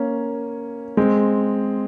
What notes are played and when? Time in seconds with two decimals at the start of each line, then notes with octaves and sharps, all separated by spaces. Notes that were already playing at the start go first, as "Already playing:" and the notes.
Already playing: A#3 C#4
0.97 G#3 C4